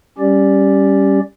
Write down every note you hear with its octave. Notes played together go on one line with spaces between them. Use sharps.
G3 C#4 G4 D5